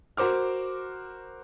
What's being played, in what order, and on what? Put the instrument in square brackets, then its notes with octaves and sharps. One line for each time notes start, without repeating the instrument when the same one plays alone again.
[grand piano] F#4 A#4 C5 D6 F6